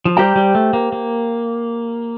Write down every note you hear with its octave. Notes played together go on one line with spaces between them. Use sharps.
F3
G3 G4 C5 G5 A#5
G3
A3
A#3
A#3